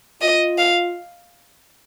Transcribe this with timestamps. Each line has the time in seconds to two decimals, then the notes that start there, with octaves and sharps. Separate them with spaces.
0.21 F4 D#5
0.58 F5